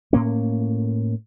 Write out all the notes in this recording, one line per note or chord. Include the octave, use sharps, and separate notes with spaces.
A2 A#3 C#4